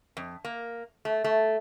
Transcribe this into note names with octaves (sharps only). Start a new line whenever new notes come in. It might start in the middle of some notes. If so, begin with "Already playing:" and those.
F2
A#3
A3
A3